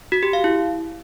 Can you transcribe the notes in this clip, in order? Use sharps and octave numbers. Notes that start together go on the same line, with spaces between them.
F#4
G4
F5
E4